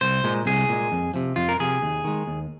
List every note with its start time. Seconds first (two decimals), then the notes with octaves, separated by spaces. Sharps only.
0.01 C2 C5
0.24 A#2 G#3
0.46 C2 G#4
0.69 A#2 G#3
0.92 F2
1.14 C3 F3
1.36 F2 F4
1.49 A#4
1.60 C3 F3 G#4
1.82 D#2
2.04 D#3 G#3
2.27 D#2